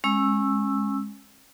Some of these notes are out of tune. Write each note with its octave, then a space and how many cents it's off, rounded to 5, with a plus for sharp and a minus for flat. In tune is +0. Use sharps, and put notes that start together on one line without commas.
G#3 +0 C#4 -25 E6 +0